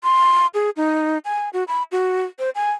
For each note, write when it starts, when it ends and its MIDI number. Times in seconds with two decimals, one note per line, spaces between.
0.04 0.47 84
0.54 0.70 68
0.77 1.18 63
1.25 1.49 80
1.53 1.64 66
1.68 1.83 83
1.92 2.23 66
2.39 2.50 72
2.55 2.71 80